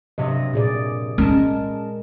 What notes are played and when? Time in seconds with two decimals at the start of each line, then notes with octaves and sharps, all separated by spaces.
0.18 G2 C3 F#3 D#5
0.53 A#2 G#4 D5
1.18 G#3 C#4 A#4 A5